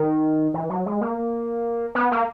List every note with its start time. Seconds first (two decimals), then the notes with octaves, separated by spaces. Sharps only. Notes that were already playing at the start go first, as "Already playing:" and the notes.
Already playing: D#3
0.54 E3
0.70 F#3
0.86 G#3
1.01 A#3
1.95 B3
2.12 A#3